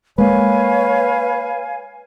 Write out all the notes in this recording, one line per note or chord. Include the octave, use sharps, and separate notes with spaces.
G#3 A#3 B4 C#5 F5 G#5